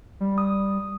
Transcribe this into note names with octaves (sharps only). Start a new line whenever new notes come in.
G3
D#6